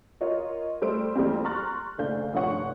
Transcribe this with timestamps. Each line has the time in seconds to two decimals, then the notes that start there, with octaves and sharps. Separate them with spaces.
0.21 F4 A#4 C#5 D#5
0.82 G3 A3 C5 E6 D7
1.16 F2 E3 G3 A3 A#3 C4
1.44 A#5 C6 C#6 F6 F#6 A6
1.98 F#1 D2 A3 D4 F5 G6
2.33 F1 G2 F3 C#5 F#5 C#6